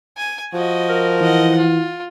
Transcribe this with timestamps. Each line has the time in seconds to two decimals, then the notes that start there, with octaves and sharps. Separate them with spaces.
0.17 G#5
0.53 F3 F#4 D#5
0.89 A#4
1.21 E3 D#5 F#5
1.57 F4